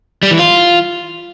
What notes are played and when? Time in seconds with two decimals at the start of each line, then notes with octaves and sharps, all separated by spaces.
0.23 G3
0.31 E3
0.39 F4